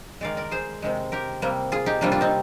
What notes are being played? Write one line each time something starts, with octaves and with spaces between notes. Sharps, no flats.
D#3 G#3 D5 F5
A#4 D5
G#4 C5
C3 D#3 G#3
G4 A#4
C3 G3 A#3
F4 G#4
D#4 G4
C3 G3 A#3 D4 F4
D4 F4
C4 D#4